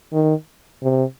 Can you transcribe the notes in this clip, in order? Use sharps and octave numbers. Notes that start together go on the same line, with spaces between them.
D#3
C3